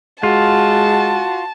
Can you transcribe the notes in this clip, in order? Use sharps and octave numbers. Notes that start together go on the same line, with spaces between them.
G#3 F4 F#4 A5